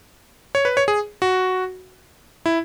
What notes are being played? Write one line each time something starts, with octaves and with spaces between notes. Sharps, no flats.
C#5
B4
C#5
G#4
F#4
E4